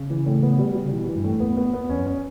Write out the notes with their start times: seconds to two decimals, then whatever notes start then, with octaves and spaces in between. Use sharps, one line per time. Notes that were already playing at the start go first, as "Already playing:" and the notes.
Already playing: C#3
0.10 E3
0.26 A2
0.43 B3
0.59 G3
0.75 G3
0.85 C#3
0.92 B2 E3
1.08 E3
1.16 G2
1.24 A2
1.40 E2 B3
1.57 B3
1.73 B3
1.89 E2 C#4
1.99 F#2
2.06 C#4